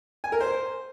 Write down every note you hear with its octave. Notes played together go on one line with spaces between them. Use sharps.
G#5
A#4
C5